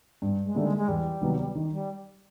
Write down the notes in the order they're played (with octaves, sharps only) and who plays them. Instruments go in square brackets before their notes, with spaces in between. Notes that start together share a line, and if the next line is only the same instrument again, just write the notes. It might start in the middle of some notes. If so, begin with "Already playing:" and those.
[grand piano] G2
[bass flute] G#3
[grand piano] D3 G3 A#3 D#4 [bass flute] A3
[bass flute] G#3
G#3
[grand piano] E2 [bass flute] G3
[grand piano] C3 D#3 F#3 B3
D#3
[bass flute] G3